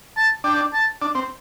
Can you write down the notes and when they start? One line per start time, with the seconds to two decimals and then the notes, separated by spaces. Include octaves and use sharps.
0.17 A5
0.44 D4 G5
0.73 A5
1.02 D4
1.15 C4